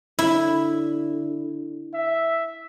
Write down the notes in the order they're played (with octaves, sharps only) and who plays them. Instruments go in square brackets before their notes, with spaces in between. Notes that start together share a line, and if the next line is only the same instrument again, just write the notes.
[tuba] D3 [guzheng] E4
[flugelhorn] E5